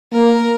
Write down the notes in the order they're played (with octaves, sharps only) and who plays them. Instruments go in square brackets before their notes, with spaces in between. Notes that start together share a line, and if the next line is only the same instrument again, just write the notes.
[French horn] A#3 [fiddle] A#4